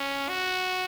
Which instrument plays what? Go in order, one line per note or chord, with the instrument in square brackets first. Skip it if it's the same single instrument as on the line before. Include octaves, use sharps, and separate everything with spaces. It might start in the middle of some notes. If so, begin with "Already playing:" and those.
Already playing: [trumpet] C#4
F#4